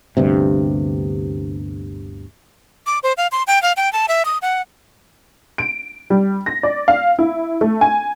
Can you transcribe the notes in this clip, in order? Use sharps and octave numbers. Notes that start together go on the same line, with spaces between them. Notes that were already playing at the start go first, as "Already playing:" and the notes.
G1 D2 G2 C3
D6
C5
F5
C6
G5
F5
G5
A5
E5
D#6
F#5
D7
G3
A#6
D5
F5
E4
A3
G#5